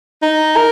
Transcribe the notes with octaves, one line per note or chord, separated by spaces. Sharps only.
D#4
A#4